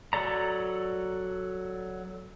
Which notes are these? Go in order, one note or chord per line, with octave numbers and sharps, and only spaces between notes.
F#3 A4 D5 A#5